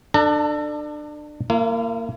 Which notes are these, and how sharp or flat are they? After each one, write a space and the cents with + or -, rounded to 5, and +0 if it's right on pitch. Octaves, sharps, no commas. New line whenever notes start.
D4 +25 A4 +15 A#5 -40
A#3 -20 E4 +40